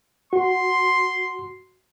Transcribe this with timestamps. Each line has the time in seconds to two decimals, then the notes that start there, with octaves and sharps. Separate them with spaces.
0.33 F#4 C6